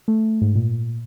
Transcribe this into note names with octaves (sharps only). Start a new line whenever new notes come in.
A3
G#2
A#2